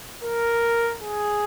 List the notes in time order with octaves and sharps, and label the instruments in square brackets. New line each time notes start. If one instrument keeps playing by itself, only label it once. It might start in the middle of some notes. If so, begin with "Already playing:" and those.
[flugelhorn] A#4
G#4